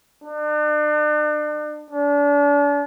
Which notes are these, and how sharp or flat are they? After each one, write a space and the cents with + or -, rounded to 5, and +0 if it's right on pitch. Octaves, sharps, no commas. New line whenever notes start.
D4 +40
D4 -35